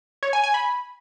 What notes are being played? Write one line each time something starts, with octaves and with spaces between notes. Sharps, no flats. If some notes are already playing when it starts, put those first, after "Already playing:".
C#5
G#5
G#5
B5